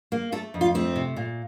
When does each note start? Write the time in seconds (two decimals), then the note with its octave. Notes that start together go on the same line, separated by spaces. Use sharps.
0.12 A#3
0.32 A3 A4
0.54 F2
0.61 F4
0.74 A3 C4
0.96 C3
1.16 A#2